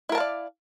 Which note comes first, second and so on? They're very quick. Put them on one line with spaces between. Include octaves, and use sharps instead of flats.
E4 A#4 A5 F5 D5